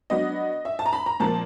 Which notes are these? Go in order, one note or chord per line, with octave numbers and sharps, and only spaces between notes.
F#3 B3 D4 D#5
E5
A5
A#5
B5
A#5
A#2 F3 A#3 A5